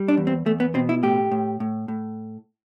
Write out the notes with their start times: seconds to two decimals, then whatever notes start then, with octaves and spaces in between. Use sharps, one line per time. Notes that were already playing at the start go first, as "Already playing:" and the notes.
Already playing: G3
0.08 D4
0.17 E2
0.27 C4
0.46 E2 A3
0.60 B3
0.74 B2 C4
0.89 E4
1.03 A2 G4
1.32 A2
1.60 A2
1.88 A2